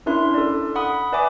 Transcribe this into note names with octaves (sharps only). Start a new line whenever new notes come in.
C#4 D4 E4 A#4 E5 C6
A4 D5
F#5 B5 D#6
B4 D5 E5 G#5 D6